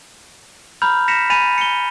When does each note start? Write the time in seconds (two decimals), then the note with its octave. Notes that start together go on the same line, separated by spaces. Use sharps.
0.82 A#5 B5 F6 G6 F7
1.08 A#6 B6 C#7 E7 F7
1.30 G#5 B5 A6 D#7 F7
1.58 C#7 G7